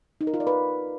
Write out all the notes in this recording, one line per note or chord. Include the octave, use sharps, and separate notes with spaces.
D#4
A#4
F4
D5
B4